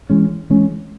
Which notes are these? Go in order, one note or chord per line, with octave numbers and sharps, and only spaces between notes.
E3 G#3 C#4
E3 G#3 C#4